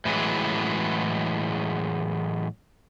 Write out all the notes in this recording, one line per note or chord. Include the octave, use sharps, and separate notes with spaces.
A2 E3 F#3 G#3